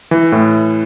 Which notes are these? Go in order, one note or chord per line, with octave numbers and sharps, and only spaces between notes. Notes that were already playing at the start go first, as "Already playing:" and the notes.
E3
A2